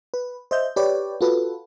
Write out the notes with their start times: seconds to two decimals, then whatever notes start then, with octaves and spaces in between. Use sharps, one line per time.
0.14 B4
0.51 C5 D#5 E5 G6
0.76 G4 B4 C#5 D5 G5
1.21 F4 F#4 A4 B4